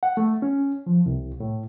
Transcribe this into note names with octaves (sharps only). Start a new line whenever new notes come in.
F#5
A3
C#4
F3
C2
A2